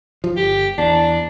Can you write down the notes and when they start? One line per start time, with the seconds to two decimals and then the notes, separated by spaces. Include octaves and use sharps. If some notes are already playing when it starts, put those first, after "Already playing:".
0.24 F3
0.37 G1 G4
0.78 E2 D4